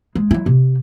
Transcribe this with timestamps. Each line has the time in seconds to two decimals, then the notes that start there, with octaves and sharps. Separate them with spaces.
0.15 G#3
0.31 F#3 E4
0.46 C3